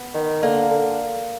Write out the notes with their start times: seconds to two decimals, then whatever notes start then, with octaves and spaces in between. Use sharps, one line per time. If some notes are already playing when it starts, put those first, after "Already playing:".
Already playing: B3
0.15 D#3
0.42 D3 A#3
0.70 D3